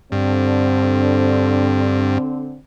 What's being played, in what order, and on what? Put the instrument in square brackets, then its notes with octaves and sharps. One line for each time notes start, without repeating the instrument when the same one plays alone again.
[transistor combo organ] G2 [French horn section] D3 C4